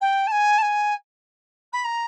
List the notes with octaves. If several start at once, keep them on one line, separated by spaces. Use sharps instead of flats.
G5
A5
G#5
A5
G#5
B5
A#5